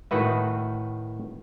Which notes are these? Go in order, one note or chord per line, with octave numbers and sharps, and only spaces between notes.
A2 D#3 F#4 B4 E5